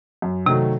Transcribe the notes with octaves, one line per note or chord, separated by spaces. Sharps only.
F#2
C3 D#3 F#3 A3